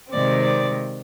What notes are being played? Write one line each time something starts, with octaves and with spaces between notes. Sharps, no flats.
C3 D#3 G#3 C4 D5
D5